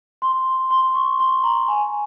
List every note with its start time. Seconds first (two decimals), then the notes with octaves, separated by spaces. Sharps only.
0.22 C6
0.71 C6
0.95 C#6
1.20 C6
1.44 A#5
1.68 G#5